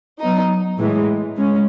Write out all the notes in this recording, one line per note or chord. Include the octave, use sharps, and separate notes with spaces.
F#3 B3 D#4
A2 E3 G#3
G#3 C#4